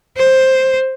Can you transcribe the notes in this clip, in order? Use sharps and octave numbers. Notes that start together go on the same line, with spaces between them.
C5